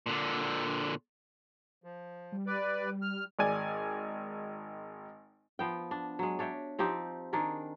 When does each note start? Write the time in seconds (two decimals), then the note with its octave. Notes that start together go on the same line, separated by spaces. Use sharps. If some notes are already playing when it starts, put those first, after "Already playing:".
0.06 A#2 D3
1.84 F3
2.32 G3
2.47 B4 D5
3.02 F6
3.39 G#1 D5 G#5
5.59 F3 B3 G5
5.91 D4
6.19 F#3 G#3
6.39 D4 C#5 E5 G5
6.79 F3 C4 D#4 G4
7.33 D#3 D4 G#4 A#4